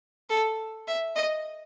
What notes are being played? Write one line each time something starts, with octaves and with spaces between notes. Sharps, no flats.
A4
E5
D#5